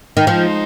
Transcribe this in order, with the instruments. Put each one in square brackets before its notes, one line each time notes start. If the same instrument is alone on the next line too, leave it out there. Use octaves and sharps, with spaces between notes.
[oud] D#3
[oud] F3 [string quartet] G#3 D#4 C5